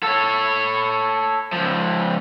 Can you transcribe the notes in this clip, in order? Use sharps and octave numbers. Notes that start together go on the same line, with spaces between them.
A4 C#5
C#2 F3